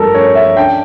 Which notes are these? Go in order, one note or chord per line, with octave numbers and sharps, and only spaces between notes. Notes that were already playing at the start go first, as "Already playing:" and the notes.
Already playing: G2 F3 A3 A4 A#4
C#4 C#5
E5
D4 G5